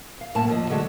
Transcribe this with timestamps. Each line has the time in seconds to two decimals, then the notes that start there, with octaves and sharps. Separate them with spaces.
0.21 F5
0.35 F#2 A2 A#3 A5
0.48 D#2 F3 D#5
0.69 D3 F#3 G#3 A3